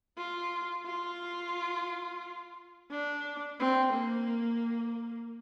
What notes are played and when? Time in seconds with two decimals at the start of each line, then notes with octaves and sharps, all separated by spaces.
0.18 F4
0.86 F4
2.91 D4
3.60 C4
3.93 A#3